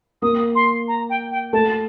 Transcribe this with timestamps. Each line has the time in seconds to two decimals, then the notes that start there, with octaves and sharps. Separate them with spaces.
0.22 A#3 D#6
0.55 C6
0.88 A#5
1.10 G5
1.32 G5
1.53 A3 A5